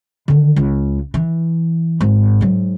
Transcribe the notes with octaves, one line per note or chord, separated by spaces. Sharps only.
D3 D#3
C#2
E3
G#1 G#2
G#2 F#3